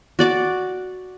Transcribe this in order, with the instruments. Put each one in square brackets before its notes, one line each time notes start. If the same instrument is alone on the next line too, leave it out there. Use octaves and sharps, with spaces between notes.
[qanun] F#4 D5 D6